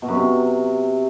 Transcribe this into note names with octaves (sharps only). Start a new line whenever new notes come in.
B2
F#2
C3